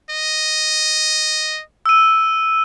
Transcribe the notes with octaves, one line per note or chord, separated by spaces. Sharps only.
D#5
E6 D#7